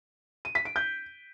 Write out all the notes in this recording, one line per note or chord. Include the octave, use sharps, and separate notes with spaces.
D#7
B6
D7
G6